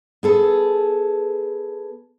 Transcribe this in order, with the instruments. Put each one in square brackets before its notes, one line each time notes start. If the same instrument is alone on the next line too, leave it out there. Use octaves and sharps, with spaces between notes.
[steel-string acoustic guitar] B3 G#4 A4